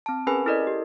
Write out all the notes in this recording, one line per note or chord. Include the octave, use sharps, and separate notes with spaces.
C4 A5
C#4 G#4 A#4 B4 G#5 B5
E4 A4 A#4 D5 D#5
G4